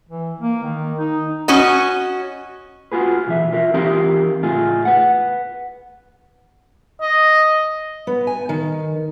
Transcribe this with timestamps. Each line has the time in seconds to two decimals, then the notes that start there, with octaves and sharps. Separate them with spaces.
0.09 E3
0.41 A#3
0.63 D#3
0.99 D#4
1.48 C#4 F#4 D#5
2.92 F4 F#4 G#4 B4
3.27 B1 E3 E5
3.52 F4 A#4 E5
3.74 E3 C4 D#4 F4 G4 A#4
4.42 C#2 A2 D#4 F4 G#4
4.85 B4 F#5
7.01 D#5
8.07 B3
8.27 G#5
8.49 D#3